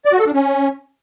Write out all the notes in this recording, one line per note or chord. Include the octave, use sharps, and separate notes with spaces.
D5
F#4
A4
D4
C#4